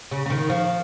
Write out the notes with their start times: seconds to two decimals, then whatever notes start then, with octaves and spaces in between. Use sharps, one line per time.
0.11 C#3
0.26 C#3
0.30 D#3
0.50 F3